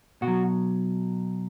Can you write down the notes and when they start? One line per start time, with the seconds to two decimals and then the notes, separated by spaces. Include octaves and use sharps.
0.22 B2 F#4
0.27 F#3